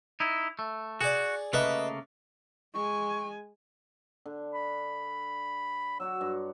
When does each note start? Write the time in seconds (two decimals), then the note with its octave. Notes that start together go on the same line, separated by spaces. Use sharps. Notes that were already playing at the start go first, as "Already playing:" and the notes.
0.20 D#4 E4
0.59 A3
1.01 F#4 G#4 D5
1.53 C#3 A3 A#3 B4 D#5 E5
2.74 G#3 G#5 C#6
4.26 D3
4.54 B5
6.00 F#3 F#4 C#5 E6
6.21 G2